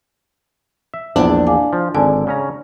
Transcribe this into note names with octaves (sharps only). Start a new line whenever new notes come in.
E5
A#1 E2 D4 E4
F5 G#5 D6
F3
G#1 D3 D5 G#5 A5
C#3 C#4 A#5